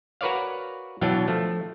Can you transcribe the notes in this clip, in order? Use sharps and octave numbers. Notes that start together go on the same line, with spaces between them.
F#4 A#4 B4 C#5 D5 F5
B2 E3 F#3 D4 F5 G5
F3 A3